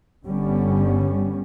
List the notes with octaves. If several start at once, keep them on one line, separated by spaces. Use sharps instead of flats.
G1 D3 G3 B3 C#4